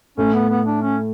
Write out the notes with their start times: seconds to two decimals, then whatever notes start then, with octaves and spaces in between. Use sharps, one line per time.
0.17 A2 A3 C#4
0.34 B3
0.50 B3
0.66 D4
0.82 C#4